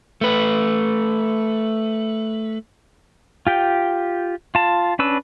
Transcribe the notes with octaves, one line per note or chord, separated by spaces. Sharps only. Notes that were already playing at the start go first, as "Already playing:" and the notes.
A3 B4
F4 G4 G5
F4 A5
C#4 D4 B4 E6